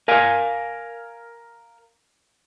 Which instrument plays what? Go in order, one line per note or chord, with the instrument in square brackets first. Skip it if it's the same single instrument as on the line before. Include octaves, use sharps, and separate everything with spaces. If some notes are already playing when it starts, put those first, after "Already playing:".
[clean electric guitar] A#4 F5 G#5